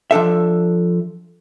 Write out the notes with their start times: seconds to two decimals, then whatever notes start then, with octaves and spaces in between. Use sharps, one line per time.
0.11 F3 D4 A4 E5